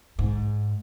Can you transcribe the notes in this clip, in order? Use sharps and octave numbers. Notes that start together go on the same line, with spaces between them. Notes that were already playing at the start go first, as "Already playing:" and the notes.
G#2